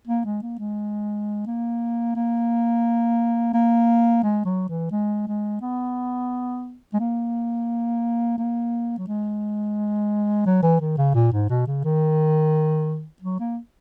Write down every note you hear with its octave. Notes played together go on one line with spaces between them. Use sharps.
A#3
G#3
A#3
G#3
A#3
A#3
A#3
G#3
F#3
E3
G#3
G#3
B3
G#3
A#3
A#3
F#3
G#3
F#3
E3
D#3
C#3
A#2
G#2
B2
C#3
D#3
F#3
A#3